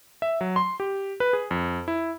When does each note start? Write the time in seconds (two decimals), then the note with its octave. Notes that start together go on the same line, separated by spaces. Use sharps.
0.22 E5
0.41 F#3
0.56 C6
0.80 G4
1.20 B4
1.33 G#4
1.51 F2
1.88 E4